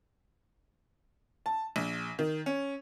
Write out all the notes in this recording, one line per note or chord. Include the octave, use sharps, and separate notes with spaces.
A5
A#1
D#3
C#4